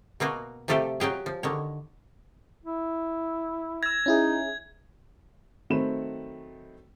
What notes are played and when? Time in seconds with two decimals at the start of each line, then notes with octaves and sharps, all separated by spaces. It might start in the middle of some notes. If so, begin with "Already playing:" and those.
0.20 B2 A#3 F4 F#4
0.68 C3 F3 A3 F4 G4 A4
1.00 F#3 F4 G4 G#4
1.26 F3
1.43 D3 D#3 C#5
2.64 E4
3.83 E6 G#6 A#6
4.06 C#4 D#4 E4 G#4
5.70 D#3 F#3 A3 C4 B5 E7